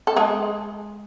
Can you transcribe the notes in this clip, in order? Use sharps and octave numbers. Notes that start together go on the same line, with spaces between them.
A4
G#3 G#4